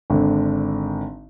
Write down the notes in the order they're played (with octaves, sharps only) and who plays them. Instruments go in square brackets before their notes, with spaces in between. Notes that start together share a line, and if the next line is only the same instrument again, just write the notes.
[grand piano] G#1 D3